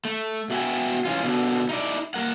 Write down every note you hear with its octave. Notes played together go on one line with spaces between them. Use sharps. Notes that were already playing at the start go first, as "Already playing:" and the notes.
A3
B2 F#4 E5 G5 G#5
E3 C#4 F4
B2 D3
D#4 E4 D5
A#3 A#4 F#5